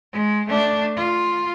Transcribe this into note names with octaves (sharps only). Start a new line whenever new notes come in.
G#3
A3 D4
F4